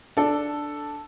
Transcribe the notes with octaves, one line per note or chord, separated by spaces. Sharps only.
D4 A4